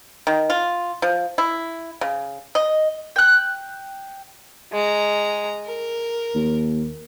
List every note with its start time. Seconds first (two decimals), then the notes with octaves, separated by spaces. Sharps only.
0.27 D#3
0.50 F4
1.02 F3
1.38 E4
2.01 C#3
2.55 D#5
3.16 G5 F#6
4.73 G#3 A#5
5.65 A#4
6.35 D#2